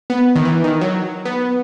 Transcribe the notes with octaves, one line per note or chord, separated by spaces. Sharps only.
B3
D#3
E3
D#3
F#3
B3